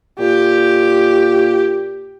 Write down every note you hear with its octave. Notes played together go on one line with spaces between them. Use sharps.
A#2 G4